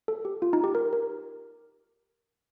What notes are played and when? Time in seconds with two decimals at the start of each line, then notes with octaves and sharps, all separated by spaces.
0.08 A4
0.25 G4
0.42 F4
0.53 D#4
0.64 G4
0.75 A#4
0.93 A#4